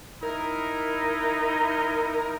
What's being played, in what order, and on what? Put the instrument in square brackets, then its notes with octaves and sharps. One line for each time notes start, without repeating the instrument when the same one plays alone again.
[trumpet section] D#4 E4 [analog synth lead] A#4